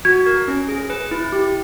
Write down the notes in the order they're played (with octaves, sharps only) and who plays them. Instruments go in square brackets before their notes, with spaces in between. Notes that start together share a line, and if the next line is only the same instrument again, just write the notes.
[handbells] F#4 [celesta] G#6
[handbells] A#4
C#4
G#4
B4
E4
G4